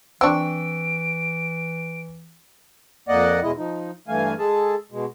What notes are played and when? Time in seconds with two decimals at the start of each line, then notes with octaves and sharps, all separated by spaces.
0.21 E3 C4 D4 C#6 E6 D7
3.08 F2 A#3 D5 D#5 F#5
3.43 E2 B2 G#3 E4 D#5
3.57 F3 D#4
4.08 G2 E3 A3 F5 G#5
4.39 G#3 G#4 A4 A5
4.92 B2 G#3